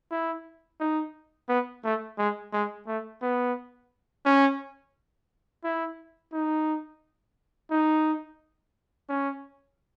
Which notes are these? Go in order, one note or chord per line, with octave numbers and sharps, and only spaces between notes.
E4
D#4
B3
A3
G#3
G#3
A3
B3
C#4
E4
D#4
D#4
C#4